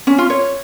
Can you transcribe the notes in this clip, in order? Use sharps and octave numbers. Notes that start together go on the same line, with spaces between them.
C#4
F4
C#5